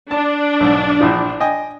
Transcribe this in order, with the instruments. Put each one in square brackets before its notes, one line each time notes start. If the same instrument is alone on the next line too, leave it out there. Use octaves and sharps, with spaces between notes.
[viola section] D4 [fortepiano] A5
[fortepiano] B1 G#2
A#1 E3 F3
D#5 G5 G#5